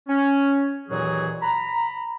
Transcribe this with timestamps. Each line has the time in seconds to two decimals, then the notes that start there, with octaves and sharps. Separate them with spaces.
0.07 C#4
0.88 D#2 A#2 E3 F#3 F#4 G#4
1.41 A#5 B5